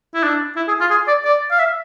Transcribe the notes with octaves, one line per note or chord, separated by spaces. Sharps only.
E4
D4
E4
G#4
F4
G#4
D5
D5
F5
E5